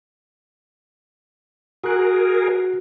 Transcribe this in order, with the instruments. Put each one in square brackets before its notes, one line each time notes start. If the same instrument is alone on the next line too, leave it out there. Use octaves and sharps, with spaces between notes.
[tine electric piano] F#4 F#6 [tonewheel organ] G#4 A#4